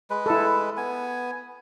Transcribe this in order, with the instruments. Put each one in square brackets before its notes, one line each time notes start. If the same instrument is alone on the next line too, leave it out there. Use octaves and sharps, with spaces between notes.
[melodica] G#3 B4
[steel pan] E4 A4
[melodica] B3 G#5